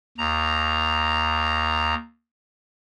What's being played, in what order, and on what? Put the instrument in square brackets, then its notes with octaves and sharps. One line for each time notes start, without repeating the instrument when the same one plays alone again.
[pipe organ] D#2 A#5